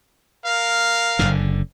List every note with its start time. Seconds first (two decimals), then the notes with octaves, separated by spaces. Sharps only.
0.44 A#4 F5
1.19 F#1 B1 D3